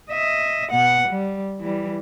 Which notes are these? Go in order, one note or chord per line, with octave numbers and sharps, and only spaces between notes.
D#5 E5
B2 F#5
G3
E3 G3